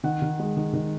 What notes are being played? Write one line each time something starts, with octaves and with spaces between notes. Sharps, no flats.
D#3 F#5
D#3
G#3
D#3
D#3